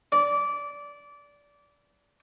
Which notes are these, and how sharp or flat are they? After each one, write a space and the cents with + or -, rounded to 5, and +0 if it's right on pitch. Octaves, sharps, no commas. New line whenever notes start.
D5 -20